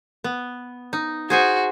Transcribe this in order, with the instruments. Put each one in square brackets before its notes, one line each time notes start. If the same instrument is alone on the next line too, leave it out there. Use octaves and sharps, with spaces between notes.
[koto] B3
D#4
[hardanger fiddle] F#4 [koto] G#4 C5 G#5